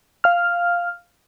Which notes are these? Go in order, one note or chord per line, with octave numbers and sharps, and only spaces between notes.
F5 F6